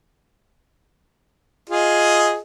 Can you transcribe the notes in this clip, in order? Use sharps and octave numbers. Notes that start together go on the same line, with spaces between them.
F4 G#4 D#5